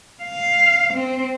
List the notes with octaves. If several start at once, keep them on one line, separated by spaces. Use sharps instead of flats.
F5
C4